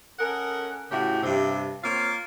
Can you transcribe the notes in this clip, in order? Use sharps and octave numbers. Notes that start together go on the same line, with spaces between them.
C#4 A4 A#4 D#5 F#5
A2 C#3 E4 F#4 G4
G2 C3
A#3 C4 F4 C#5 F5